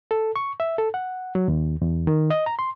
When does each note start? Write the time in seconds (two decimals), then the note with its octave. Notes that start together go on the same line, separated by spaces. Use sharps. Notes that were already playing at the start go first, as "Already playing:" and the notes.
0.11 A4
0.36 C#6
0.60 E5
0.78 A4
0.94 F#5
1.35 F#3
1.48 D#2
1.82 E2
2.07 D#3
2.30 D#5
2.46 A#5
2.59 C6